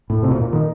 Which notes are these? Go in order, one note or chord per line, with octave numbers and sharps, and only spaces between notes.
A2
C3
A#2
A#2
D#3